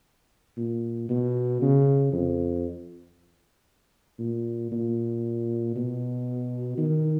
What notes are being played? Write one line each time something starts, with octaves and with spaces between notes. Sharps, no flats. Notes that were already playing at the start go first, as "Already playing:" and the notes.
A#2
B2
C#3
F2
A#2
A#2
B2
D#3